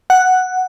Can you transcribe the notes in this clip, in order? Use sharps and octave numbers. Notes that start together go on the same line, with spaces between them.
F#5